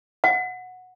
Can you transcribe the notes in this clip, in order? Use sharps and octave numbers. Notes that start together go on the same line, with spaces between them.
F#5